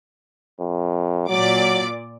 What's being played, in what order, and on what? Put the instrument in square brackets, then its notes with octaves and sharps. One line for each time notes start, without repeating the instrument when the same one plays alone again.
[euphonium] F2
[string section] A#2 D5 D6 [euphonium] F#3